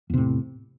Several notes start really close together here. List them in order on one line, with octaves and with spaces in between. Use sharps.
E2 C3 A2